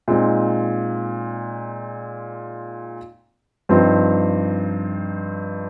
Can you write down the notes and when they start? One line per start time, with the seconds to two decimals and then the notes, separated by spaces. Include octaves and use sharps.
0.08 A#2 G#3 C4 D#4
3.69 G2 F3 C4 D#4